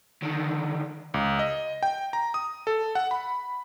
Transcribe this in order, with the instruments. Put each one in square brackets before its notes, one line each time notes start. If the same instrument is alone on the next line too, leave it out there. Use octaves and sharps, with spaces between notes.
[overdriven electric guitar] D3 D#3
[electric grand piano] C#2
D#5
G5
A#5
D#6
A4
F#5
B5